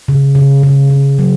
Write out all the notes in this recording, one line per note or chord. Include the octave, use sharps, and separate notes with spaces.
C#3
C#3
C#3
C#3
F#3